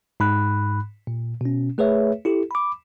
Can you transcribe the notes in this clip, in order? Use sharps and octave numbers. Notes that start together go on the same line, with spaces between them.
G#2 B5 F#6
A#2
B2 C#4
A3 G#4 B4 C#5 E5
E4 G4 A4
B5 D6